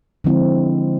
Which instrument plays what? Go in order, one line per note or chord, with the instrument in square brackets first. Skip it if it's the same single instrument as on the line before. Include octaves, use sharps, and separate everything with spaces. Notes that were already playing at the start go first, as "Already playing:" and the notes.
[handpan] D3 F3 G#3 C4 E4